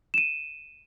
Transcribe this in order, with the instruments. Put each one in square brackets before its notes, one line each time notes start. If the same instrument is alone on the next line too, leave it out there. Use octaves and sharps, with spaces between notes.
[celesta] D#7 E7